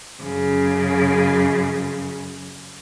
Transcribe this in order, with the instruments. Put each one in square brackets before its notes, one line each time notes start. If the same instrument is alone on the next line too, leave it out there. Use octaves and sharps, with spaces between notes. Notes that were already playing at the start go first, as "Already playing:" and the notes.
[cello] F#2 C#3